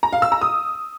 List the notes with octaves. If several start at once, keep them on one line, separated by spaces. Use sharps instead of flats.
A#5
F5
E6
A#5
D#6